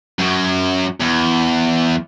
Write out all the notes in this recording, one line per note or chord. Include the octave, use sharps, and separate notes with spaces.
F#2 F#3
E2